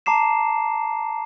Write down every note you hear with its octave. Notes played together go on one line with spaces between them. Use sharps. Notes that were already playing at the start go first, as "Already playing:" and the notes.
A5 A#5 D6 C7 E7